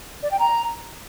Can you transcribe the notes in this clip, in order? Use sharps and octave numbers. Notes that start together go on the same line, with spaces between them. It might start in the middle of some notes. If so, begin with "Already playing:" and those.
D5
G5
A#5